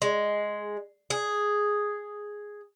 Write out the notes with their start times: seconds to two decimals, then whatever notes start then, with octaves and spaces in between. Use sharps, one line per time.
0.02 G#3
1.10 G#4